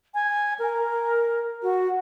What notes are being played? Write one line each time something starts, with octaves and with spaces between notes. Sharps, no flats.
G#5
A#4
F#4